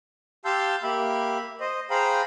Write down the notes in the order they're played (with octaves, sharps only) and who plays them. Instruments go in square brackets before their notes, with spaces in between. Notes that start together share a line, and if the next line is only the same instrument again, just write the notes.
[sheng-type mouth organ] G4 F5 A5 C6 E6 G6
A#3 G4 E5 B5
C5 D#5
G#4 C5 F5 G5 A#5 B5